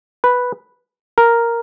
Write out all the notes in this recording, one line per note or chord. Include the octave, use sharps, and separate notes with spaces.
B4
A#4